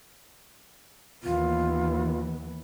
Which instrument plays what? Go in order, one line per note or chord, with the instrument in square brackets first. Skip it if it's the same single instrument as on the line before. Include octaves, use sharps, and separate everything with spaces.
[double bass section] D#2 E3 B3 [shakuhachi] F4